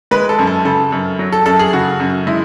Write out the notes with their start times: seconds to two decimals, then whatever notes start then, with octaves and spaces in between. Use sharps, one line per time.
0.11 G#3 B4
0.29 A4
0.39 F#2
0.47 A4
0.65 C#3 A4
0.92 F#2
1.19 F#3
1.33 A4
1.46 F#2 A4
1.59 G#4
1.73 C#3 F#4
2.00 F#2
2.27 G#3 E4